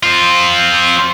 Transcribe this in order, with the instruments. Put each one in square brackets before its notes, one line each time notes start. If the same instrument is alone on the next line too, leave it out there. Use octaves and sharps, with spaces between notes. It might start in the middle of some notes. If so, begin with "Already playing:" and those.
[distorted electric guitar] C4 F4